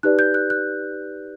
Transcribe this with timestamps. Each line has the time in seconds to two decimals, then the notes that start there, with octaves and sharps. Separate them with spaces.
0.03 D#4 G4 B4 D5 F#6
0.19 G6
0.34 F#6
0.50 F#6